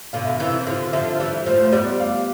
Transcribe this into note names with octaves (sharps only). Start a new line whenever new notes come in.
B2 D3 F5
E5
C3 E3 F5
E3
D3 F3
D3 F3 E5
E3 G3 E5
F3 A3 C5
C5
G3 B3 D5
F5